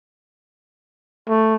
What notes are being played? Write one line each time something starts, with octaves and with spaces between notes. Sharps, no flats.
A3